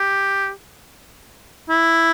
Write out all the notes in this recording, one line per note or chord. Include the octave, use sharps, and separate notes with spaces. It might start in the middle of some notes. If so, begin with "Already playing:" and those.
Already playing: G4
E4